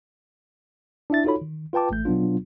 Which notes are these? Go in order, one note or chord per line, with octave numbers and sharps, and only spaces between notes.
D4 E4 E5 A6
D#4 F4 F#4 A4 C#5 B5
D#3
F4 B4 G5 A5 D6
A1 A3 G6
B2 F#3 B3 D4 F4